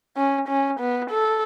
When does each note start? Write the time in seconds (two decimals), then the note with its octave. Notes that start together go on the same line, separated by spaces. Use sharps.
0.17 C#4
0.48 C#4
0.80 B3
1.11 A4